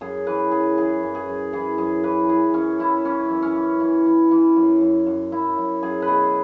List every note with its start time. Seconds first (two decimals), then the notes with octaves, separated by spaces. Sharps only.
0.01 F#2 G#4
0.27 E3 B4
0.51 F#2 G#4
0.77 E3 G#4
1.03 F#2
1.15 G#4
1.28 F#2
1.53 E3 G#4
1.78 F#2 G#4
2.04 E3 B4
2.29 E3 G#4
2.54 F#2 C#4
2.79 E3 E4
3.05 E3 C#4
3.30 F#2
3.42 C#4
3.55 E3
3.80 E3
4.06 E3
4.31 E3
4.56 F#2
4.81 F#2
5.06 F#2
5.32 F#2 E4
5.58 F#2
5.82 F#2 G#4
6.02 B4
6.08 B2 G#4